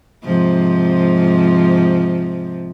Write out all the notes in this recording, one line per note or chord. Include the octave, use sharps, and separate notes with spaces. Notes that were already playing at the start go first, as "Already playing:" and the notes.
G#2 C3 F3